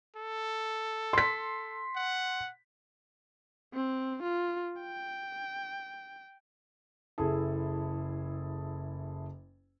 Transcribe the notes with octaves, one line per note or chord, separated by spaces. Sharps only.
A4
C6 B6
F#5
C4
F4
G5
F#1 E4 G#4 A4 A5